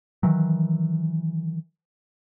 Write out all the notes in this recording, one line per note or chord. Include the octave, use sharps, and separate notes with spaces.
D#3 E3 F#3